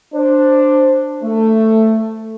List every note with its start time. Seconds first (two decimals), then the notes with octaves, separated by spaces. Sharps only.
0.14 D4 C5
1.23 A3